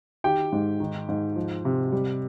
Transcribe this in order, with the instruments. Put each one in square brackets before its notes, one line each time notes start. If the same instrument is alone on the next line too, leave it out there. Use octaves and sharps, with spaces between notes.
[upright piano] D#3 G4 G5
G#2
D#3
G#2
F3
C3
G3